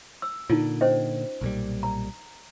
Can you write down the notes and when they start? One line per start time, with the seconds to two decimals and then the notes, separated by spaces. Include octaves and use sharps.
0.22 E6
0.50 A#2 D3 D#4 F4
0.81 C#4 C5 D#5
1.41 B1 A#2 G3
1.83 A#5